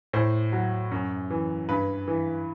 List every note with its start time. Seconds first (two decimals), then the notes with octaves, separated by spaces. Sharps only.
0.13 A2 C5
0.52 F#3
0.91 F#2
1.30 E3
1.69 G2 B4
2.08 E3